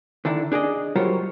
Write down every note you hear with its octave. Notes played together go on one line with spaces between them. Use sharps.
D3 D#3 D4 E4
D4 G#4 D5 D#5
F#3 G3 F4 A#4 C5 C#5